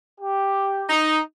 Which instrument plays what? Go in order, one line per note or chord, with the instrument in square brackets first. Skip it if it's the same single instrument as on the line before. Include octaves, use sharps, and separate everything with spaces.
[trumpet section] G4
[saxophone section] D#4